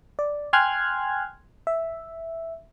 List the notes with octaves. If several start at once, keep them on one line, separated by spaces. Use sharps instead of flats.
D5
G5 G#5 C6 F6 F#6 G#6
E5